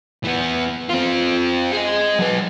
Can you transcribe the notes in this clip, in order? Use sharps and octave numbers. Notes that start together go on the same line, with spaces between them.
E3 B3
C4 F4
G#4 D#5
F#3 B4